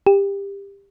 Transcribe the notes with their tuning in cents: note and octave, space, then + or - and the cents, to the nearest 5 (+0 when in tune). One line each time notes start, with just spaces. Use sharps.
G4 +20